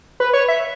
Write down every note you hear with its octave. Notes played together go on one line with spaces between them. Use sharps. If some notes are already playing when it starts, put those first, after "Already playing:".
B4
C#5
E5